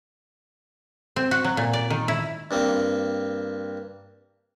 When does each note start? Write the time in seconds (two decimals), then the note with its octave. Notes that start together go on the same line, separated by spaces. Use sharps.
1.16 C4
1.31 F#4
1.44 F#3
1.57 A#2
1.73 D5
1.90 D#3
2.08 E4
2.51 G2 A#3 C4